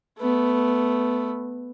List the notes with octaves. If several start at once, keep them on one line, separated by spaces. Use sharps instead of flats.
A3 B3